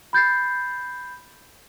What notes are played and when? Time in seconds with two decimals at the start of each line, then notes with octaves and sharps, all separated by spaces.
0.13 B5 G6 A6 C7